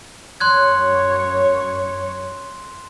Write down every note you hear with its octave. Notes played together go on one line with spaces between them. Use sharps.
F#2 C#5 C6 F#6 G#6